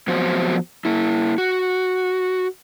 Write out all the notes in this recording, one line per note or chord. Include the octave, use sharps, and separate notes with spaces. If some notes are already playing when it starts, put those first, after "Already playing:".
F3 F#3 B3 C4 F#4 C5
A#3 E4
F#4